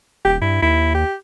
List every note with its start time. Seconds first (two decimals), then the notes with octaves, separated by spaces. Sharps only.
0.25 D#1 G4
0.41 G2 E4
0.62 D#2 E4
0.94 G4